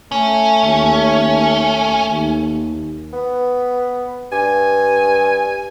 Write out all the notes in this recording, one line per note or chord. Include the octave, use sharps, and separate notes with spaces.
A3 C#4
D#2
D#2
B3
G2 G#5